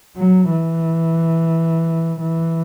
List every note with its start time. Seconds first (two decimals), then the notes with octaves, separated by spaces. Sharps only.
0.17 F#3
0.51 E3
2.21 E3